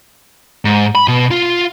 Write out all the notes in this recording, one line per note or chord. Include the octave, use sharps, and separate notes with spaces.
G#2
B5
B2
F4